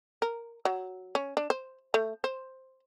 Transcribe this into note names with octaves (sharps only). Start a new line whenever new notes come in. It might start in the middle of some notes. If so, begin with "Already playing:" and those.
A#4
F#3
C#4
D4
C5
A3
C5